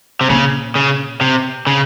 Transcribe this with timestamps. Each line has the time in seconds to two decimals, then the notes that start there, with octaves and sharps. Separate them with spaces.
0.21 C3
0.30 A#2 C#3
0.75 C#3
1.21 C3
1.67 C#3